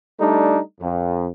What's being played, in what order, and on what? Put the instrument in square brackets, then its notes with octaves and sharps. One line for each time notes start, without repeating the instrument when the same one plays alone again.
[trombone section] G3 A3 D4 D#4
F2